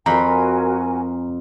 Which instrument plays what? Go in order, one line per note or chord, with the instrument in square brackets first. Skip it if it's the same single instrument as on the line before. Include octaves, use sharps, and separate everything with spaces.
[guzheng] F2 B5 [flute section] F#4 A#4 G#5 [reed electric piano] A#5